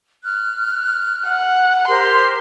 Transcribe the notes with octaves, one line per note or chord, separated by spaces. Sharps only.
F6 F#6
F#5
G4 A#4 C5 C6